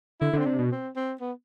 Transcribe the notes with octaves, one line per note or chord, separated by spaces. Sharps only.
D3 E4
D3 C4
C3 D4
B2
C4
C4
B3